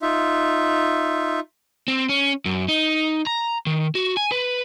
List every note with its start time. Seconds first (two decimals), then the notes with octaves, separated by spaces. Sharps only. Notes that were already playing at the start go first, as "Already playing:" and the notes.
0.02 D#4 F4 E5
1.88 C4
2.09 C#4
2.46 F#2
2.68 D#4
3.27 A#5
3.66 D#3
3.95 F#4
4.17 G#5
4.32 B4